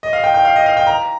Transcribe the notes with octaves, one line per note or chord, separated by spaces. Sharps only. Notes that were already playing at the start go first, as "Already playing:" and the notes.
D#5
F5
G5
G5
F5
D#5
F5
G5
A#5